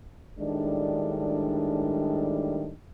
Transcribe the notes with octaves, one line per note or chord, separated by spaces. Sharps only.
A2 D#3 G3 G#3 D4